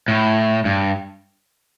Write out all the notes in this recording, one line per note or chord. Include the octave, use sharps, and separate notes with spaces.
A2
G2